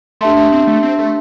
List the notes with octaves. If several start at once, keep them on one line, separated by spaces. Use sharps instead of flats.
A3 D4 G4 E5 A5 C6
A3
C4
A3
C4
A3